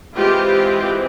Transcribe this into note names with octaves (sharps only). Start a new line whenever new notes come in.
E3 G#3 C4 F4 G4